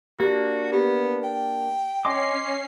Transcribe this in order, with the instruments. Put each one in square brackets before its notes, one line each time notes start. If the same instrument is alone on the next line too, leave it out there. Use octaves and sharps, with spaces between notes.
[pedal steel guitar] A#3 D4 [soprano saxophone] F#4 [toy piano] G4
[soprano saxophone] B3 [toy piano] G4
[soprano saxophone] G5
[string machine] C#4 C7 [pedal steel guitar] D#5 C6 D6 [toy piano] G#5